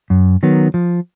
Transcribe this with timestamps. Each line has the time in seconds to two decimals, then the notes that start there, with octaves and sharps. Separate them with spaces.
0.10 F#2
0.43 D#3 F#3 B3
0.74 F3